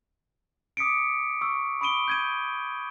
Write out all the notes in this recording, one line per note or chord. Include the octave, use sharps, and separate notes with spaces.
D6 D#6 B6 C#7 D7
C#6 E6
B5 C#6 D#6 D7 D#7 G7
G6 G#6 D#7